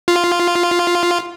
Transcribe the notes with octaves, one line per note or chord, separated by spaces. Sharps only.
F4